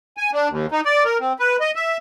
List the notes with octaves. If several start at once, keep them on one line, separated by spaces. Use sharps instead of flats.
G#5
D4
D#2
D#4
D5
A#4
C4
B4
D#5
E5